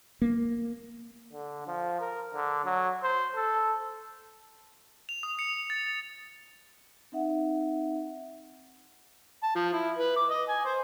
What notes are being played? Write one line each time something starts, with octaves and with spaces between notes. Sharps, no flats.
A#3
D3
F3
A#4
D3
F#3
C5
A4
F7
D#6
C#7
A6
A6
C4 D#4 E5 F#5
A5
F3
E4
B4
D6
D#5
G#5
C5